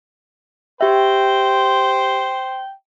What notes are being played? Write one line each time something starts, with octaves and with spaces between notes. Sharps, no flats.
G4 C5 E5 G5